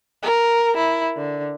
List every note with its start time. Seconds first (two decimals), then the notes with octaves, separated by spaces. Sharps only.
0.23 A#4
0.77 E4
1.17 D3